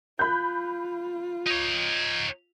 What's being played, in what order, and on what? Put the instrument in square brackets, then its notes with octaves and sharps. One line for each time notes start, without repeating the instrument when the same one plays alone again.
[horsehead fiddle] F4 [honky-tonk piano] B5 F#6 G6
[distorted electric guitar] D#4 C#5